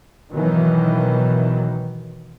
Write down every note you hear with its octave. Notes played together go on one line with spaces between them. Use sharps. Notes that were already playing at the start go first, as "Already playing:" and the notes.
B2 D#3 E3 F#3